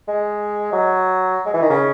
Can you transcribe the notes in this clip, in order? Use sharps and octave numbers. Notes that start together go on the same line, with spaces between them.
G#3
F#3
G#3
E3
D#3
C#3